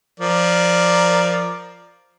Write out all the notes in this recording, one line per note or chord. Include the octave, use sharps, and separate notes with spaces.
F3 A#4 D5